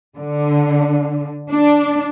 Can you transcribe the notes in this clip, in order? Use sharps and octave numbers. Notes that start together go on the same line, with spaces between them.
D3
D4